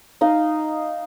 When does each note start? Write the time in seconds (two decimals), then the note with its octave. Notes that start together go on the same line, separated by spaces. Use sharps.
0.21 D#4 D#5 F5